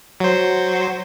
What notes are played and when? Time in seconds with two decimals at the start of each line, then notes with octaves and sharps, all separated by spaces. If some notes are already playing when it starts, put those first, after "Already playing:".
0.20 F#3 C5